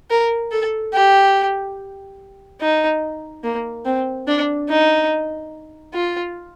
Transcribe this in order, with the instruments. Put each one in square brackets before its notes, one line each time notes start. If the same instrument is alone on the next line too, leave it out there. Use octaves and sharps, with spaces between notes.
[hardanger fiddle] A#4
A4
G4
D#4
A#3
C4
D4
D#4
F4